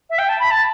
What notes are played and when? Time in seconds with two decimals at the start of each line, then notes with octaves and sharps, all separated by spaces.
0.10 E5
0.18 G5
0.29 A5
0.39 B5
0.51 A5